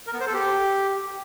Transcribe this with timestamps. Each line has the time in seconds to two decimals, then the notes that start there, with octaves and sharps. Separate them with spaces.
0.07 A#4
0.14 B3
0.20 C5
0.27 A4
0.34 G4